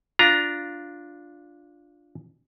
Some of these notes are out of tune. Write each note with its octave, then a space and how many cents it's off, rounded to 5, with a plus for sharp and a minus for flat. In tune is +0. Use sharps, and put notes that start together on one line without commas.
D4 +0 F4 +0 A#5 +5